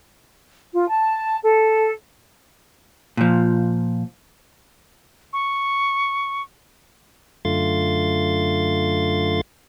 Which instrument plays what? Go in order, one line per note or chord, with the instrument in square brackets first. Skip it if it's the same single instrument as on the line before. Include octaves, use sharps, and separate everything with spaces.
[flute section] F4
A5
A4
[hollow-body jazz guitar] A#2 F3
[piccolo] C#6
[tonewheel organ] F#2 D3 A3 F4 C6 A6